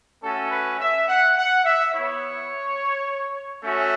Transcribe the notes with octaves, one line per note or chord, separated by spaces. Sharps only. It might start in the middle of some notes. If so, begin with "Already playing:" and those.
A3 C#4 F#4 A4
B4
E5
F#5
F#5
E5
B3 E4 C#5
A3 C#4 F#4 E5